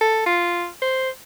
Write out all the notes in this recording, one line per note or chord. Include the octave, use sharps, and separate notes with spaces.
A4
F4
C5